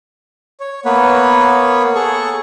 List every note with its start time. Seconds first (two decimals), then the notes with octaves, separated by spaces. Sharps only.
0.60 C#5
0.85 A#3 B3 B4 C#5
1.95 G#4 A4 C#6